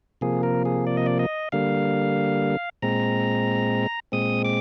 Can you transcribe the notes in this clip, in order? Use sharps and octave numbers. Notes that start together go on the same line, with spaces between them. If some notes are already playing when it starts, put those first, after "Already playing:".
C3 F3 A#3 G#4
A#4
G#4
D5
D#5
D5
D#5
D3 G3 A#3 F5
A#2 G#3 C4 A#5
A#2 G#3 C4 D#6
D6